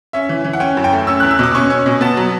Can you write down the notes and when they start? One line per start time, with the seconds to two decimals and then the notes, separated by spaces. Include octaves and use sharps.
0.13 C#4 E5
0.29 E3
0.44 E3
0.53 F#5
0.60 C#4 G5
0.77 F#2
0.84 G5
0.93 A3
1.07 C#4 E6
1.20 F#6
1.23 E2
1.31 E6
1.39 B2 D6
1.55 C#4 C#6
1.70 C#4
1.86 B2
2.01 B3 A5
2.17 F#3